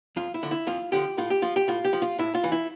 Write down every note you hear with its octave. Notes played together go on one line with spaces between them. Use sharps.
F2 F4
E4
D3 F3
E4
F2 F4
D3 F3 G4
A2 F4
G4
F3 F4
G4
A2 F4
G4
F3
F4
A2 E4
F4
E3
E4